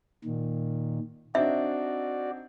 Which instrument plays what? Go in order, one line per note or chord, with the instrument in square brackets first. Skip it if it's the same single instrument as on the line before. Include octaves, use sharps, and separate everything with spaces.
[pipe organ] A#2 D#3
[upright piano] C4 D4 D#4 [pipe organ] F#4 D5 [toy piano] E5